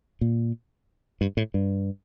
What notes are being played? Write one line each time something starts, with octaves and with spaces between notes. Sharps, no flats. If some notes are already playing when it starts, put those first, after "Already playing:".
A#2
G2
A2
G2